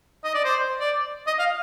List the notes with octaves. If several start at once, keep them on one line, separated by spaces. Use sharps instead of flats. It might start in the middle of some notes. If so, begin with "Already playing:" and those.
D#5
D5
C5
D5
D#5
F5